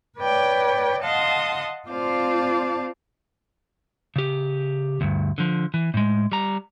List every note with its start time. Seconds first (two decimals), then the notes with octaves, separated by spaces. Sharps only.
0.18 B4 C#5 D5 G5
1.02 D#5 F5 F#5 A5 C6 D#6
1.88 C4 F4 C5 D5 F5 A5
4.16 C#3 G4
5.01 D2 G2
5.38 D3 F3
5.74 E3
5.94 A2 G#3
6.32 G3 A#5